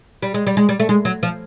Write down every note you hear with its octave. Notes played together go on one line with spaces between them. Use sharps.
G3
G#3
G3
G#3
G3
A3
G#3
F#3
F3